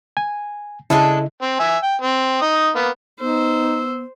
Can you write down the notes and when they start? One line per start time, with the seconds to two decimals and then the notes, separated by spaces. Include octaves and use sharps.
0.17 G#5
0.90 C#3 G#3 D4 E4 A4 D#5
1.41 C4
1.59 E5 G#5
1.83 G5
2.01 C4
2.42 D#4 D#6
2.75 A#3 B3
3.21 B3 D#4 C5 E6